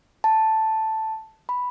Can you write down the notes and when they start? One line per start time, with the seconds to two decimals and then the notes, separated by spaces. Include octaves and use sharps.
0.24 A5
1.49 B5